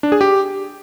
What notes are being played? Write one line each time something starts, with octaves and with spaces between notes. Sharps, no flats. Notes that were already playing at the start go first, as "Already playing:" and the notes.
D4
G#4
G4